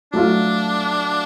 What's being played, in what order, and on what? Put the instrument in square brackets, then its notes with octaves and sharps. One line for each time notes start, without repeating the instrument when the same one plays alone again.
[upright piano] F#3 A3 F4 [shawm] D4